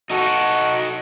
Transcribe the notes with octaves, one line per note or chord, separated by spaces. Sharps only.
D#4 F#4 A4